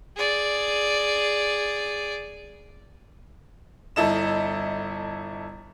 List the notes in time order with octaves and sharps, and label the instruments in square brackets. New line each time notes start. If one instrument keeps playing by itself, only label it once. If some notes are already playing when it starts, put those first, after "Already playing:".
[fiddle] G#4 D5
[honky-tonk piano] G1 E4 A4 D#5 E7